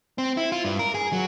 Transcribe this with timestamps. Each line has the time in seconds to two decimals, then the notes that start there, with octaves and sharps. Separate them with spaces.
0.18 C4
0.37 E4
0.52 F4
0.64 G2
0.79 A#4
0.94 G#4
1.13 F#3